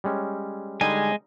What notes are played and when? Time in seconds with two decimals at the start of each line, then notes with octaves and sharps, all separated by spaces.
0.04 G3 G#3 C#4
0.81 D3 G3 G#3 D#4 G#5